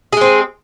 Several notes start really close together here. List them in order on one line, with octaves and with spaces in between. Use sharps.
G#4 G#3 C4